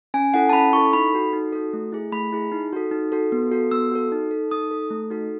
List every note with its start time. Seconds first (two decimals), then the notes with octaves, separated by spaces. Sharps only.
0.14 C#4 G#5
0.34 E4 A4 F#5
0.49 A5
0.53 C#4 B5
0.73 E4 A4 C#6
0.93 D#4 B5
1.13 F#4 A4
1.33 D#4
1.53 F#4 A4
1.73 A3
1.92 E4 G#4
2.12 A3 B5
2.32 E4 G#4
2.52 D#4
2.73 F#4 A4
2.91 D#4
3.12 F#4 A4
3.32 B3
3.51 F#4 A4
3.71 B3 E6
3.92 F#4 A4
4.12 D#4
4.31 A4
4.51 D#4 D#6
4.71 A4
4.90 A3
5.10 D#4 F#4 A4